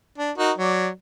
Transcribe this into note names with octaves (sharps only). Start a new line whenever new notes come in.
D4
D#4 F#4 A#4
F#3 D5